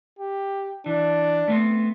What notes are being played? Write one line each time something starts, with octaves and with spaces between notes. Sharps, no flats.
G4
E3 D4
A3 B3 C4